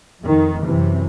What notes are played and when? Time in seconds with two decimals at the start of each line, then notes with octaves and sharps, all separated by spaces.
0.22 F2 D#3
0.64 F#2 C3 E3